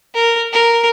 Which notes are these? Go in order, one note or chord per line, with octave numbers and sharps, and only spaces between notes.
A#4
A#4